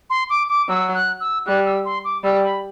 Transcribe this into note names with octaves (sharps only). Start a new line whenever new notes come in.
C6
D6
D6
F#3 E6
F#6
E6
G3 F#6
E6
C6
D6
G3 E6
B5